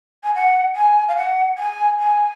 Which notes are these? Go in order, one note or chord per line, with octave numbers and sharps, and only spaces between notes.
G#5
F#5
G#5
F5
F#5
G#5
G#5